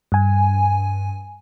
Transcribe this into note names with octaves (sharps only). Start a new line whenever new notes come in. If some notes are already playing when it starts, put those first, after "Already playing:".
G2 G#5